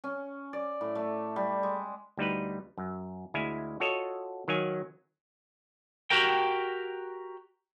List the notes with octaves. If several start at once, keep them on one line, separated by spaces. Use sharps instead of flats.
C#4
D5
A2
A3
G3
G#3
D2 G3 D#4 B4
F#2
D2 G#3 E4 F5 G#5
F4 F#4 A4 C#5 D#5
D#3 F#3 F5 G#5
F#4 G4 A#4 G5